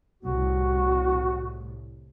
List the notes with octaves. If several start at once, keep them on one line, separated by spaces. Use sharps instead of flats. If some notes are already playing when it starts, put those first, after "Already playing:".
C2 A2 F#4